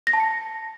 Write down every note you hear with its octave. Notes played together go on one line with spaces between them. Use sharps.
A#6
A5
C#7